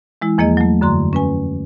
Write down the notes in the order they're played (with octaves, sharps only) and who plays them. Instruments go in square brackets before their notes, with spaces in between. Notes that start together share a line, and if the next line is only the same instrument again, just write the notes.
[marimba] E3 G#3 E4
E2 F3 A#3 G#4 D#5
F#3 A3
F#2 D3 A#5 C6
C#4 B4 G#5